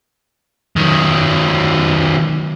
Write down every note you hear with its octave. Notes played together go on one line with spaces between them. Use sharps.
D#3 F#3